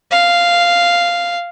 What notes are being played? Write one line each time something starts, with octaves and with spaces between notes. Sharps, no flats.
F5